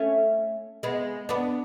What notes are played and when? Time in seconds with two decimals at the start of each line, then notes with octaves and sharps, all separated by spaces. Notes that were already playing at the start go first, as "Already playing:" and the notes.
Already playing: A3 C#4
0.83 G#3 B3
1.29 B3 D4